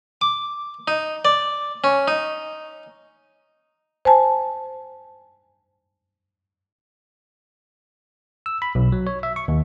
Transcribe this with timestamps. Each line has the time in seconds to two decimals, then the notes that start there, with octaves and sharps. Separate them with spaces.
0.21 D6
0.88 D#4
1.25 D5
1.84 C#4
2.08 D#4
4.05 C5 G#5 A5
8.46 E6
8.62 B5
8.75 B1
8.92 F#3
9.07 C#5
9.23 E5
9.36 C#6
9.48 D#2